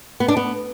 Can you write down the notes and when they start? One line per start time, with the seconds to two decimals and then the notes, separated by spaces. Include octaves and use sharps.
0.20 B3
0.28 D4
0.37 B3